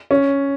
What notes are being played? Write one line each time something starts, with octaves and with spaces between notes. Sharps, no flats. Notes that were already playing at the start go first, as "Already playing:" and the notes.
C#4